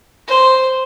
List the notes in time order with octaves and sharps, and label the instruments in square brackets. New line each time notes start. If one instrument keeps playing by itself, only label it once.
[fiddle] C5